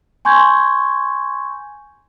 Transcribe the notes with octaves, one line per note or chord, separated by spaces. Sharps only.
G#5 C6 C#6 G6 G#6